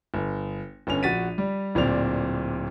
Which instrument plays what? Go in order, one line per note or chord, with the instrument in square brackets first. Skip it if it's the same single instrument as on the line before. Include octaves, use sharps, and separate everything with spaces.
[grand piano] G1
G1 C#4 F7
A#1 F#4 A6 B6 D#7
G3
D1 A#2 C4 D5 F7